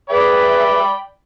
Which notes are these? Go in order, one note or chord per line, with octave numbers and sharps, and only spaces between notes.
G#4 B4 D5 E5 G5 B5